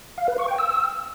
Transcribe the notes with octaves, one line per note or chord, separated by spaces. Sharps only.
F5
B4
C#6
G5
E6